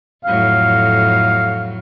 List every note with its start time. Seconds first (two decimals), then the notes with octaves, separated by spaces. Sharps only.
0.25 F2 A2 F#3 F5